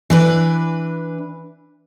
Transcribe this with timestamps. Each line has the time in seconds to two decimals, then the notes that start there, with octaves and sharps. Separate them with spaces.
0.10 E3 D4 B4